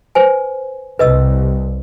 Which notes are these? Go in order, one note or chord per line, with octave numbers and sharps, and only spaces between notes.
B4 C5 G#5
C2 B4 D#5 E6